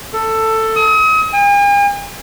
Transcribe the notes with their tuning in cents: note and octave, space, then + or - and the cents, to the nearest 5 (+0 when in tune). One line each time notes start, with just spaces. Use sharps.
A4 +10
D#6 +40
G#5 -45